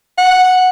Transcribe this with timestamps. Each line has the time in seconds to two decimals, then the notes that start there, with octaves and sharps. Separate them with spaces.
0.18 F#5